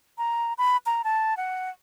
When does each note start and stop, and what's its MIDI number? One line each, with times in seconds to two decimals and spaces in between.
0.18 0.53 82
0.58 0.77 83
0.86 1.02 82
1.04 1.36 81
1.37 1.70 78